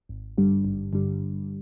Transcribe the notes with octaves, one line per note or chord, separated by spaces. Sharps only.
G#1
G2 D3 G3
G#1
G2 D3 G3